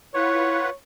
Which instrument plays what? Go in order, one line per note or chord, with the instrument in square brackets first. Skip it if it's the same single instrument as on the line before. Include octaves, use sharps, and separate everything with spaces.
[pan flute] E4 [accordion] F4 B4 F#5 [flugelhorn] C#5